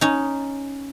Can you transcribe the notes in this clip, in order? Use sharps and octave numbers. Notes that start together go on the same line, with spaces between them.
C#4 D#4